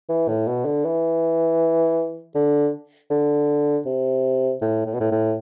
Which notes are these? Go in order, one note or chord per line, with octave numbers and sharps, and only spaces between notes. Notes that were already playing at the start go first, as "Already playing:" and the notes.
E3
A2
B2
D3
E3
D3
D3
C3
A2
A2
B2
A2
A2